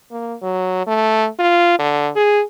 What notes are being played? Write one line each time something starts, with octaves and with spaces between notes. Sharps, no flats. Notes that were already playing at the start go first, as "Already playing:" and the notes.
A#3
F#3
A3
F4
D3
G#4